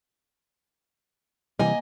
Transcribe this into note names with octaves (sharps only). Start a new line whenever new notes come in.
C3 E3 G3 A#3 D#5 G#5